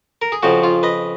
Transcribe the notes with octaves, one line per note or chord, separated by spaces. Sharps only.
A#4
G#4
F2 C#3 F3 F#4
F4
B4 D#5